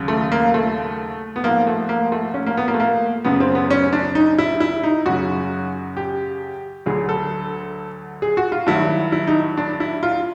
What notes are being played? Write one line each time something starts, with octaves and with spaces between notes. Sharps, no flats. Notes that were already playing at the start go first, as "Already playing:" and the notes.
Already playing: D#2 C#3 F#3
A3
A#3
A3
B3
G#2 F3 A#3
A3
A#3
A3
C#4
A#3
B3
A#3
A3
A#3
F#2 C#3 F#3 B3
C4
B3
C#4
D4
D#4
E4
E4
D#4
F#2 C#3 F#3 F#4
G4
D2 D3 F#3 G#4
A4
G#4
F#4
F4
G2 D#3 F#3 E4
E4
D#4
D4
E4
F4